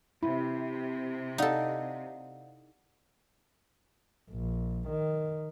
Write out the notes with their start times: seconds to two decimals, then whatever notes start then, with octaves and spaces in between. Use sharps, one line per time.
0.23 C3 E4 B5
1.38 D#4 A4 D5 F5 F#5
4.30 A#1
4.88 D#3